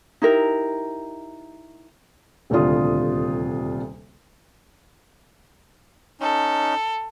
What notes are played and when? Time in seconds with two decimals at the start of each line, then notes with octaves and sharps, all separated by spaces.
0.22 D#4 E4 G4 A#4
2.50 D#1 D2 C3 D4 F4 D#6
6.21 C#4 D#4 A4